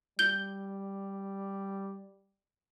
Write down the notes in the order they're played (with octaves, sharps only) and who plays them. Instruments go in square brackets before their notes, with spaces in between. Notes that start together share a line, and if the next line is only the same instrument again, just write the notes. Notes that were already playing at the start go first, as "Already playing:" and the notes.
[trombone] G3 [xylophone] G6 G7